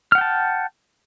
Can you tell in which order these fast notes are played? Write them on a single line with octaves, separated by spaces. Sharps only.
F6 F#5 G5 A5